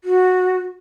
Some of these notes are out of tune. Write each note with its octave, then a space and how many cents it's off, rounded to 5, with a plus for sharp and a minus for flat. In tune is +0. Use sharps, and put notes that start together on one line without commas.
F#4 -10